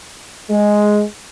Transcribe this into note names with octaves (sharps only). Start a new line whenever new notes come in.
G#3